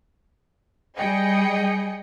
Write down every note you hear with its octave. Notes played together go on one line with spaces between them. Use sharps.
G3 G#4 D#5 G5 C#7